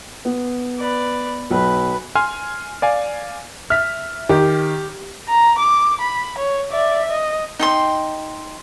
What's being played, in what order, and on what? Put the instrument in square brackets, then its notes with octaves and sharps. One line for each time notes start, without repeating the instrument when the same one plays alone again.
[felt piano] B3
[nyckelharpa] B4 D5
[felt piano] B1 [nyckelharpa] B4
[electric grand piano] G#5 C6 F6
D5 F5 G#5
[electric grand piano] E5 B6 [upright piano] F6
[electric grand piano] D#3 [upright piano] G4
[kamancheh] A#5
D6
B5
C#5
D5 E5
D#5
[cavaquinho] D#4 G5 C6